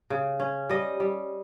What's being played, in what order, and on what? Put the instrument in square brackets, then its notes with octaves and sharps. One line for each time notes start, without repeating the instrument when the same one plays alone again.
[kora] C#3
C#4
G3 D#5
G3